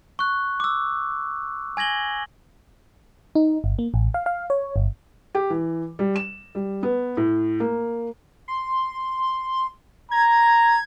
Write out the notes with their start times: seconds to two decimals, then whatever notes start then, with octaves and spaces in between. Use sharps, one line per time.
0.19 C#6 F#6
0.60 D6 E6
1.77 G#5 G#6 A#6 F#7 G7
3.35 D#4
3.64 G1
3.79 A#3
3.94 A1
4.14 F5
4.26 F5
4.50 C#5
4.76 G1
5.35 G4
5.50 E3
5.99 G3
6.16 E7
6.55 G3
6.83 B3
7.17 A2
7.60 A#3
8.48 C6
10.11 A#5 G#6